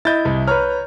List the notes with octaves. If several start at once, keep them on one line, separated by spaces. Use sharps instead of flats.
E4 D#5 G6 A6
C2
B4 C#5 A#5 F6